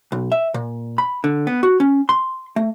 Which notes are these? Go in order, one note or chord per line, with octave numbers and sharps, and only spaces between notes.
B1
E5
A#2
B5
D3
B3
F#4
C#4
C6
A3